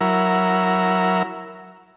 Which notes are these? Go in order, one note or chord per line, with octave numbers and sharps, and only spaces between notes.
F#3 E4 A#4